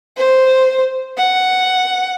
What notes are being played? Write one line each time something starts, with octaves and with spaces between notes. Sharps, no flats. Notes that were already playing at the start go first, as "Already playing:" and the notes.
C5
F#5